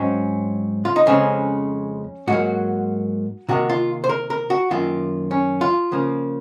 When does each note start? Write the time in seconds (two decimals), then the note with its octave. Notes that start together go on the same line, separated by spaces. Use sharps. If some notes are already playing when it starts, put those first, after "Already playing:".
Already playing: G#2 F#3 C4 C#4
0.85 F4
0.96 D#4
1.06 F2 C#3 G#3 C4 C#4
2.27 G#2 F#3 A#3 F#4
3.49 C3 D#3 A#3 F#4
3.69 F4
4.04 C5
4.09 A#4
4.30 A#4
4.50 F#4
4.71 F#2 D#3 A#3 F4
5.31 C#4
5.61 F4
5.92 C#3 F3 A#3